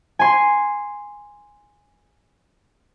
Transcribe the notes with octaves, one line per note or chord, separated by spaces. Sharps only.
G#5 C6